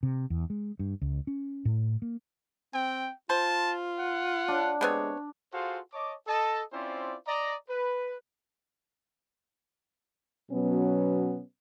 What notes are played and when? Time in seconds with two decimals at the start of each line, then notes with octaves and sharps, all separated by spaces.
0.03 C3
0.30 E2
0.50 G#3
0.79 G2
1.02 C#2
1.27 C#4
1.65 A2
2.02 A#3
2.74 C4 G5
3.30 F4 C5 A5
3.99 F#5
4.48 D4
4.81 C3 G#3 B3 C#5
5.54 F4 F#4 G#4 A4 C5 F5
5.92 C#5 D#5 A5 D6
6.27 A4 D#5 A5
6.73 C4 C#4 E4 F4 C5 D5
7.27 D5 D#5 A#5
7.69 B4
10.51 B2 F#3 B3 C#4